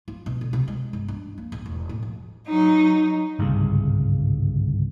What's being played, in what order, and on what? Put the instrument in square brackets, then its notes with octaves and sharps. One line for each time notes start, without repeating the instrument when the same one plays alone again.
[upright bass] F4
B2
D3
C3
G#3
G1
D4
A#3
A#1
E1
A2
F3
[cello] F#3 D#4
[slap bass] G1 C2 G#2 C#3